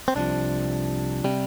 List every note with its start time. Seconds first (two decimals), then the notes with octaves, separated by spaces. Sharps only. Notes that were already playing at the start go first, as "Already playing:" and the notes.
0.08 C4
0.15 C2 C3 F3 D4
1.24 C3 G3